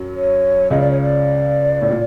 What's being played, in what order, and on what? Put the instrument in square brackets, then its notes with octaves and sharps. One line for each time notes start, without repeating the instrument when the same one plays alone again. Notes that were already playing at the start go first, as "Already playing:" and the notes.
Already playing: [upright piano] F#2 F#3
[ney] C#5
[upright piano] C#2 C#3 [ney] D#5
[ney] D5
C#5
D5
[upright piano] A2
A#2